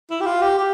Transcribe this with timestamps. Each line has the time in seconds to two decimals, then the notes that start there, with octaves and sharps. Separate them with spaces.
0.11 E4
0.21 G4
0.26 F4
0.42 G4
0.59 G4